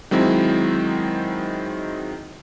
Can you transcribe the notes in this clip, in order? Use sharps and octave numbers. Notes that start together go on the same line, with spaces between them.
D#3 F#3 G#3 C4 E4